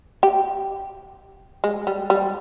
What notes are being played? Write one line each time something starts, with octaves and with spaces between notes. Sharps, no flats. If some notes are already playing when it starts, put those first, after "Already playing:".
G4
G#3
G3
G3